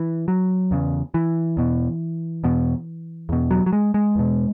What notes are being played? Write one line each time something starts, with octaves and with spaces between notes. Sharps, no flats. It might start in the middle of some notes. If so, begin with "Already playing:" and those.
Already playing: E3
F#3
E2 C#3
E3
E2 B2
E2 B2
E2 B2
F#3
F#3
G#3
G#3
E2 B2